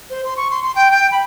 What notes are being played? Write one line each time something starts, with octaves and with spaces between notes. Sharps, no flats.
C5
C6
C#6
C6
C6
G5
G5
B5